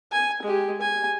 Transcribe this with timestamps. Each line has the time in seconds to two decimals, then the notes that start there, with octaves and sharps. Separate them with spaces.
0.12 G#5
0.43 G#3 G4
0.81 G#5